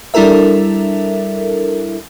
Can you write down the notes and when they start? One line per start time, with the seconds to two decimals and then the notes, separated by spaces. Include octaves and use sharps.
0.14 G3 D4 E4 A4 A#4 E5